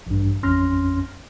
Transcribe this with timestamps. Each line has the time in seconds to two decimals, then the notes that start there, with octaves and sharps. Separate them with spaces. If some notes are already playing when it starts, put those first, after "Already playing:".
0.07 A1 G2
0.43 A1 F2 C#4 C6 F6 A#6